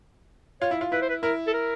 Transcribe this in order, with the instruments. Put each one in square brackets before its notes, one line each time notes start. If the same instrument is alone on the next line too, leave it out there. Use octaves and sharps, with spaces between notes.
[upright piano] F4 [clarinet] C#5
[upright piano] E4
F4
[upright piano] E4 [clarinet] B4
[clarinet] C5
B4
[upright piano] E4 [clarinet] A#4
[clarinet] A4
A#4